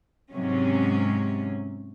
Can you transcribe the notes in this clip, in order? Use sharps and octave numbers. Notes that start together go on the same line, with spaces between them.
G#2 C3 F#3 C#4